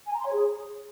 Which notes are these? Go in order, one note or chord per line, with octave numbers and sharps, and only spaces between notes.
G#5
A#5
C6
C#5
G#4